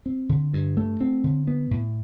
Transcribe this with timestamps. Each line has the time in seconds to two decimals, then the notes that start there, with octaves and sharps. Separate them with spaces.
0.06 C4
0.29 D3
0.53 G2
0.77 A3
1.01 C4
1.24 D3
1.47 B3
1.71 A2